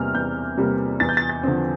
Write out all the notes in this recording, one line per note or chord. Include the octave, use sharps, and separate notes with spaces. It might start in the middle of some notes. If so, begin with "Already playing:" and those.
Already playing: E2 C3 G3 A#3 F6
E2 G6
C3 G3 A#3
E2 A6
G6
A6
A6
D3 F3 C4